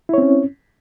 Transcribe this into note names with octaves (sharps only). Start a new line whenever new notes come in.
C4 C#4 E4 C#5